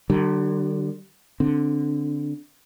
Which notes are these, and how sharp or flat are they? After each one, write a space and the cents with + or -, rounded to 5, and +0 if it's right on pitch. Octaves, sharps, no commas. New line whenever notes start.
D3 +30 G3 -35
D3 +0 C4 +0